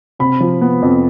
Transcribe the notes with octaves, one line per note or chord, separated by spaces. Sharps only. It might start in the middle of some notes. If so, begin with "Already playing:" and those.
C3 B5
F3
B3
F2